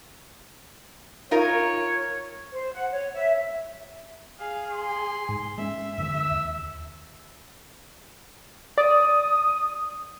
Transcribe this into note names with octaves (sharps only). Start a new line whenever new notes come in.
D#4 F4 A#4 C#5
C5
F#5
C#5
E5
G#4 F5
C6
G#2
G#3 A#3 C#4 E5
F#2 D3 E3 E6
D#2
D5 D#6